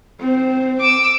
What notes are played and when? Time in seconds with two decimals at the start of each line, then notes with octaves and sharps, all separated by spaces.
0.20 C4 C5
0.81 D6 E6